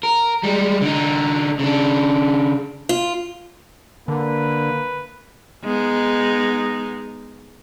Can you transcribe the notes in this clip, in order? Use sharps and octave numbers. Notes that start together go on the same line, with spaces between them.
A#4
G3 G#3
D3 D#4
C#3 D4
F4
D3 A#3 B4
G#3 B3 D#4